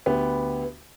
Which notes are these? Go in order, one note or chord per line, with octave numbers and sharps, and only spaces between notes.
D2 B3 G4